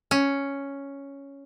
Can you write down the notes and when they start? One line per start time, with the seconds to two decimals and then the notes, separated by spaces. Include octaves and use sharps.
0.11 C#4